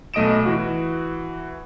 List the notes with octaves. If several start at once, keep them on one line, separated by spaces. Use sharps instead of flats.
B1 A3 D#5 D#6 D7 E7
E3 F#4